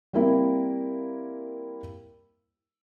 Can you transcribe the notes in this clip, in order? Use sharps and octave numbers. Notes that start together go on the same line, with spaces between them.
G3 A#3 C4 E4 A#4